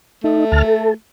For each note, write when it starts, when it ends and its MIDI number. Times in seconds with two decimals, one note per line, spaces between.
0.24 0.92 57
0.24 0.45 63
0.52 0.62 38
0.52 0.62 81
0.52 0.62 89
0.64 0.94 69